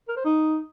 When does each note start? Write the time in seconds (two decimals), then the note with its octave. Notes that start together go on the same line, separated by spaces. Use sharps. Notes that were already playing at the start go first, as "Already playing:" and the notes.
0.08 A#4
0.17 C5
0.25 D#4